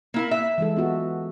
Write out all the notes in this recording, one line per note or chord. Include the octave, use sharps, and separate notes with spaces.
A#3 E4 A#4
E5
E3 G#3 A4
B3 F4 F#4